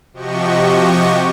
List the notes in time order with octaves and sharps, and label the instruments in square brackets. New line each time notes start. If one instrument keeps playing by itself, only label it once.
[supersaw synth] C3 F3 F#4 G4 D#5 C#6